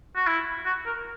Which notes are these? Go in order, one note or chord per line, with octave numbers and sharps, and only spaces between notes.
F#4
E4
F#4
A#4